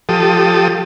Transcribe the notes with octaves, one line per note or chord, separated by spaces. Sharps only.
F3 G4 A4 D#6